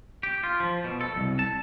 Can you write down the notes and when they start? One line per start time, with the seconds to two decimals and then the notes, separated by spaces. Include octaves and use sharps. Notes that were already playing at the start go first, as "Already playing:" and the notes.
0.23 G4
0.43 F4
0.60 F3
0.84 B2
1.01 A4
1.16 C2
1.39 A5